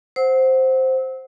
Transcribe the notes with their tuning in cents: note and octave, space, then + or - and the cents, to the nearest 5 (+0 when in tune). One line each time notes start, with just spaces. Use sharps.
C5 +0 F#5 +0 E6 -30